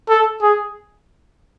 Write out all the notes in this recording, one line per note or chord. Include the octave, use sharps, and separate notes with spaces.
A4
G#4